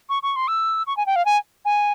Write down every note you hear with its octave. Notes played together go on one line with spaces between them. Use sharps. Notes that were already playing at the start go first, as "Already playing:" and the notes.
C#6
C#6
C6
E6
C#6
G#5
G5
F5
G#5
G#5